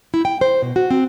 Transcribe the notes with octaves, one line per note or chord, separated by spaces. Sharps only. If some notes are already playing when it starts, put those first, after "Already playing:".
E4
G5
C5
B2
F#4
C4